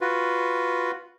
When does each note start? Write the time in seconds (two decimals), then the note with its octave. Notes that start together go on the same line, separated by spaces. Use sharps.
0.01 F4 F#4 B4